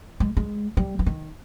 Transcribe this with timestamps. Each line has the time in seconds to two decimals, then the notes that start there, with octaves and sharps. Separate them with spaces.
0.20 G#3
0.37 G#3
0.77 G3
0.99 E3
1.06 D#3